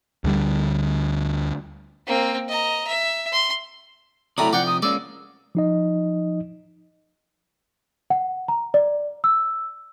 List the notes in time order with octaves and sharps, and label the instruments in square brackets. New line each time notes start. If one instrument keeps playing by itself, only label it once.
[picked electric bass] D2 D3 G3
[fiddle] A#3 C4
D#5 A#5
E5
C6
[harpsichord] A2 B5 D#6 [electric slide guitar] C3 F#3 D5 [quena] A#5
[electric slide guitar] C3 F3 [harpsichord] D5 G5 [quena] F#5
[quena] D#6
[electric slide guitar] G#3 A#3 C#4 [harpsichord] D5 [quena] E6
[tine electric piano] F3 D#4 D#5
[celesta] F#5
A#5
D5
E6